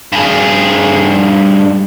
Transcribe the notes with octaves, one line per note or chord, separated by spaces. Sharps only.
G2 G#4